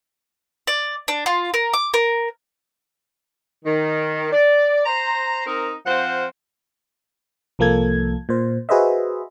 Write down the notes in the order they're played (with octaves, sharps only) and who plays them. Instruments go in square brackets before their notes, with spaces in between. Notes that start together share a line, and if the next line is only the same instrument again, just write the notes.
[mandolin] D5
D4
F4
A#4
D6
A#4
[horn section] D#3
D5
C5 A#5
C4 D#4 A#4
F3 C4 C5 F5 F#5
[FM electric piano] C2 F3 A#3 A4 G#6
A#2 C5
F#4 G#4 B4 C5 D#5 E5